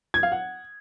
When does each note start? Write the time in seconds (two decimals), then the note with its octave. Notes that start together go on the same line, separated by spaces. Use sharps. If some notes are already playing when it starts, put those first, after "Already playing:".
0.14 G#6
0.23 F5
0.32 F#5